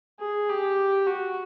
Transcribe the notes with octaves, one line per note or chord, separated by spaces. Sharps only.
G#4
G4
F#4